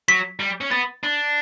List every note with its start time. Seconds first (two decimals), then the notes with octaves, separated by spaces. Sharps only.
0.08 F#3 B6
0.40 G3
0.61 C#4
0.71 B3 A6
1.03 D4